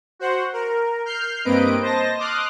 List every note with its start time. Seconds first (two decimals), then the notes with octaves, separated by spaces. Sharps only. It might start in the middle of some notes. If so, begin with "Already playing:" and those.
0.19 F#4 C5 F#5
0.53 A#4
1.05 F6 G6 C7
1.44 G2 A#3 C4 B4 D#5 D7
1.82 C5 D#5 A5 A#6
2.18 C6 D6 D#6 F6 F#6